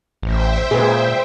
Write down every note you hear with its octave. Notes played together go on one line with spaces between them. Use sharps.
A1 C5 E5 G5
A#2 G#4 B4